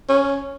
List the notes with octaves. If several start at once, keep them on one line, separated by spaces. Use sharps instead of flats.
C#4